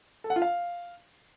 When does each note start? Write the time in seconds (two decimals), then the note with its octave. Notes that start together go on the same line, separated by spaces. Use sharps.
0.24 A4
0.30 F#5
0.36 F4
0.42 F5